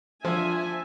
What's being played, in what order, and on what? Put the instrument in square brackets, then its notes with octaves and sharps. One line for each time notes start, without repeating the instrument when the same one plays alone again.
[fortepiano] F3 [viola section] D4 E5 G#5